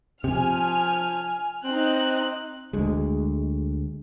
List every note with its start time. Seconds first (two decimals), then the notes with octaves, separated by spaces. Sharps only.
0.24 C3 F3 G#5 F6
1.64 C4 D#4 F#6
2.73 D2 G#3